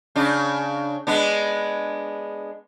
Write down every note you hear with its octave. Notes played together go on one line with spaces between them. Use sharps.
C#3 D4
G#3 B3 D4